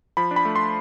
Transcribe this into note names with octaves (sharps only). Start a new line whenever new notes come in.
F3 B5
D4
B5
A3
C6